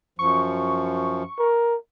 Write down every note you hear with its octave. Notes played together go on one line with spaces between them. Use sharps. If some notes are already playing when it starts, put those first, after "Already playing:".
F#2 F3 C#6
A#4